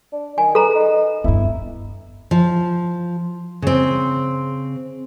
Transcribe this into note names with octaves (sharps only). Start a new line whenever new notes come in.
D4
D#3 G#5
A4 B4 A#5
D#4
G2 B3 E4
F3
C#3 C4